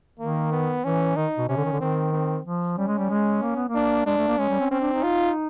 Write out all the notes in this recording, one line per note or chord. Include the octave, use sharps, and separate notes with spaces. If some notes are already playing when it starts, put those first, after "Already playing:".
D#3 A#3
B3
E3 C#4
D#3 D#4
B2
C3 C#4
D3
D#3
D3
D#3 C4
C4
F3
G3 C#4
G#3
G3
G#3
A#3
B3
A#3
D4
G#3 D4
A3
A#3
G#3 C#4
G3
C4
C4 C#4
D4
D#4
F4